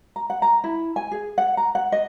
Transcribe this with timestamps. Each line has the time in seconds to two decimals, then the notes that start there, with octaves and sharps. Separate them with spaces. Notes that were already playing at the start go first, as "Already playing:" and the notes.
0.16 A#5
0.30 F#5
0.42 A#5
0.64 E4
0.96 G#5
1.12 G#4
1.38 F#5
1.57 A#5
1.75 F#5
1.92 D#5